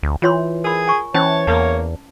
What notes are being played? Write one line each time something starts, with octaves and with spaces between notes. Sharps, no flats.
D2
E3 F4 C#5 C6
G#4 A#4 B5
G#5 C#6
E3 C#4 C5 C#5 A5
E2 A#3 A5 A#5